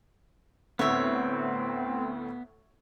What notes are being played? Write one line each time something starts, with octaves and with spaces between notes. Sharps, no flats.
D2 A2 B3 C4 C#5 E5